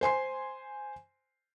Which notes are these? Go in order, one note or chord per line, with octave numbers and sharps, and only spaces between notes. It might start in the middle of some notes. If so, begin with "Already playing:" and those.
C5 G#5 C6 C7